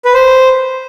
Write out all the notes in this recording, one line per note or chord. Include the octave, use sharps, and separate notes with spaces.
B4
C5